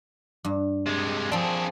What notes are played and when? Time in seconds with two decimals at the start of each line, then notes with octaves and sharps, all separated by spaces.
0.45 G2
0.87 C3 G#3
1.32 F3 C4 D4 G#4